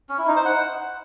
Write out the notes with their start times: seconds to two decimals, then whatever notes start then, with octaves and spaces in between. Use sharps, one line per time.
0.09 C#4
0.18 E4
0.27 D#4
0.36 C5
0.45 F#5